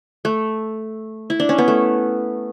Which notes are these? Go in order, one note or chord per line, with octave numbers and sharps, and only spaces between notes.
A3
E4
D4
C#4
B3
A3